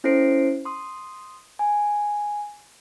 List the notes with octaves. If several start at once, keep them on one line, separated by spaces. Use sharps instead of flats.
C#4 E4 A4 C5 C7 D7
C6 D#6
G#5